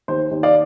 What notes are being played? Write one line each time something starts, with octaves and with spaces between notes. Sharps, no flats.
D#2 C5
D#2
D5 F5